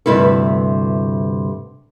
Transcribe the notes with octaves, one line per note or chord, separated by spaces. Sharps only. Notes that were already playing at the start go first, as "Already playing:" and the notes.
D2 G2 C3 E4 B4